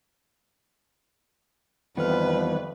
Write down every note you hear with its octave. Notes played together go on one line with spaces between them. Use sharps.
F2 D#3 E3 G3 B3 B4 F6